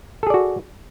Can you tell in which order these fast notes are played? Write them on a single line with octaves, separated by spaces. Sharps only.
A4 G#4 D5 F#4